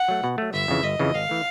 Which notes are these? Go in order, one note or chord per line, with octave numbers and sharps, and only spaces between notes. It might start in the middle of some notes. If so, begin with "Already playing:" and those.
Already playing: F#5
F#3 A3
B2
F#3 A3
G1 E5
F2 C#3 E3
G1 D#5
F2 C#3 E3
G#1 F5
E3 A3